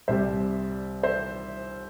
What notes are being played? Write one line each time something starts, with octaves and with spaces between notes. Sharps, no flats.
C2 C3 G3 C5 E5
C5 E5